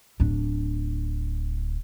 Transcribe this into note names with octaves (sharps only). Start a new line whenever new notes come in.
D1 D4